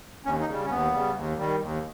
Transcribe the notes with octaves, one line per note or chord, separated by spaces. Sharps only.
D#2 C#4
D#4
C#3 G3
C#4
D#2 B3
C#3 G3
D#2
D#3 G3
D#2